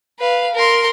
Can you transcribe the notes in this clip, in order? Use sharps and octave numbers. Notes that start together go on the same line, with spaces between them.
B4 F5
A#4 C6